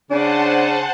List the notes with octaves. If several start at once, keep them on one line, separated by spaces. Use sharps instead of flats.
C#3 D4 C5 F#5 G#5 A5